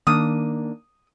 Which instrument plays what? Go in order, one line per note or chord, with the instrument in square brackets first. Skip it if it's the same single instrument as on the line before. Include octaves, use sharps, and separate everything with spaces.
[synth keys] D#3 A#3 D4 [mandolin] D#6